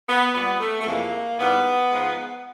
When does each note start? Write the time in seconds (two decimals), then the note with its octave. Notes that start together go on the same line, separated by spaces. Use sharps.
0.08 B3
0.34 A#2 G3 B3
0.60 A3
0.81 A3
0.86 F2 C3 E3 G#3 A#3
1.39 G#2 E3 G3 B3
1.91 G#2 F3 G#3